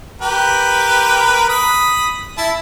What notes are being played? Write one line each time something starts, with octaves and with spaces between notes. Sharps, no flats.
G4 A#4 B4
B5 D#6
E4 A5